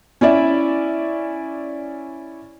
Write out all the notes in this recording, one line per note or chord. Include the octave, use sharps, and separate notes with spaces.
C#4 E4 D5 E5